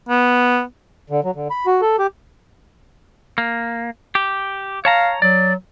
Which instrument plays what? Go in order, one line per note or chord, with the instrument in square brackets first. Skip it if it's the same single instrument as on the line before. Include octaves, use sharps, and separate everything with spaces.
[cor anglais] B3
[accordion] D3
F#3
D3
B5
F#4
A4
G4
[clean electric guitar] A#3
G4
[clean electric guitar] C#5 A5 A#5 [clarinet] F5
[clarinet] F#3 [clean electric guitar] D5